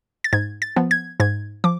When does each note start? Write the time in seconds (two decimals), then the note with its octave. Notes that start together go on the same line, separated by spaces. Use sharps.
0.24 A6
0.33 G#2 G#6
0.62 A6
0.76 F3 B3
0.91 G#6
1.20 G#2 G#6
1.64 F3 D6